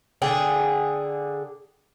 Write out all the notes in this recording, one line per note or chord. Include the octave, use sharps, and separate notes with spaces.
D3 G#4 G5